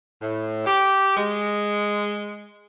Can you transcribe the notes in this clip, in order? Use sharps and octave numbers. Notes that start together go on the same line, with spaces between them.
A2
G4
G#3